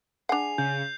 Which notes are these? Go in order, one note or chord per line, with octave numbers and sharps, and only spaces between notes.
D4 G#4 F#5 C7 F7
C#3 G6